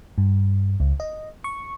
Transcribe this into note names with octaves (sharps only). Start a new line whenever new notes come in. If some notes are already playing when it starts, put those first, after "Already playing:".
G2
C#2
D#5
C#6